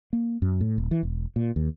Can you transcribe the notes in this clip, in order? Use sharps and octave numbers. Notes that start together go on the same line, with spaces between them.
A#3
F#2
A2
D#1
E3
E1
A#2
D#2